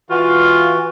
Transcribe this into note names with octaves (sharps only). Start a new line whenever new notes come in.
E3 F4 F#4